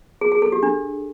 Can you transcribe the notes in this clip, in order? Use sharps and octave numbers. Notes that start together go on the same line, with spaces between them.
G#4
G#4
A4
G4
D4